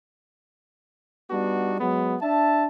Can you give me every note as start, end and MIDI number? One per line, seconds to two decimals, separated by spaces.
1.31 1.76 55
1.31 1.76 59
1.31 1.76 62
1.31 1.76 63
1.31 1.76 66
1.80 2.16 54
1.80 2.16 56
1.80 2.16 59
2.21 2.67 62
2.21 2.67 76
2.21 2.67 81